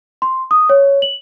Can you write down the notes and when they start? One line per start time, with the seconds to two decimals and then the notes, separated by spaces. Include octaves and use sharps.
0.22 C6
0.51 D#6
0.69 C#5
1.02 F#7